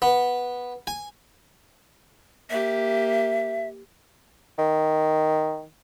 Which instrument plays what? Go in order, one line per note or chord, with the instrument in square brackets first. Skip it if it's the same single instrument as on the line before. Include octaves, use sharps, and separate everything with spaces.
[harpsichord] B3
G#5
[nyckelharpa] A#3 G4 [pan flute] E5
[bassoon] D#3